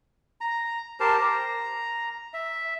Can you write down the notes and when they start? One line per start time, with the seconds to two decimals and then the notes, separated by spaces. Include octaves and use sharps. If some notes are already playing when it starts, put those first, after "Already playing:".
0.41 A#5
1.00 G4 A#4 C5 A5
1.18 A#5
2.34 E5